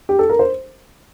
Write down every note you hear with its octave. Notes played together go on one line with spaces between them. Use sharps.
G4
A4
A#4
C5